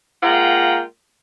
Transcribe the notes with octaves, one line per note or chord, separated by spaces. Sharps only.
G#3 A#3 F4 F#5 G5 A#5